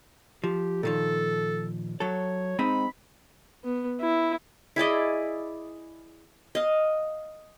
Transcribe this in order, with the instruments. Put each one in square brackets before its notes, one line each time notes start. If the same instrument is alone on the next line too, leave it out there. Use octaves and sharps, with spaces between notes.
[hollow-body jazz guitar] F3 [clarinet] G4
[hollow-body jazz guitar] A#2 D#3 F3 [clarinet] A4
[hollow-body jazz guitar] F#3 A4 [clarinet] C#5
[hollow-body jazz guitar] G#3 C4 D#4 [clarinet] B5
[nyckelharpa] B3
E4
[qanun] E4 G#4 D5 D#5
D#5 F5